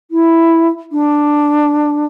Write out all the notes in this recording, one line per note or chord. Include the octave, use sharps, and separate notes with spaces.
E4
D4